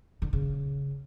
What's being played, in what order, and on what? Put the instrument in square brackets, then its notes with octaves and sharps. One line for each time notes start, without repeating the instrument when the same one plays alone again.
[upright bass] D3
C#3